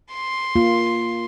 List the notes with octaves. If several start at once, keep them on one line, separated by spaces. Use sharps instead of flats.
C6
A#3 F4